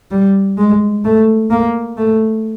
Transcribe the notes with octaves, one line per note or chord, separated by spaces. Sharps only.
G3
G#3
A3
A#3
A3